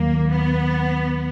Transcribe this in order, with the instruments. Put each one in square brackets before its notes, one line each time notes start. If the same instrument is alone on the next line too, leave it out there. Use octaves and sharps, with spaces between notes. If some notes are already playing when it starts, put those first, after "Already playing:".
Already playing: [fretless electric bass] D#2 D#3 F#3 [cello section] A#3
[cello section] B3